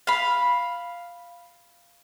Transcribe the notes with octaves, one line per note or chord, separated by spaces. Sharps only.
F5 B5